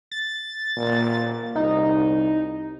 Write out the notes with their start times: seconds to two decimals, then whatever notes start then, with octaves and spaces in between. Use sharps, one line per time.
0.11 A6
0.77 A#2
1.55 C2 D#4